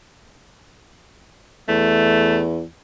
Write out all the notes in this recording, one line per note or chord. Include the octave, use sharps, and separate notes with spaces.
E2 A3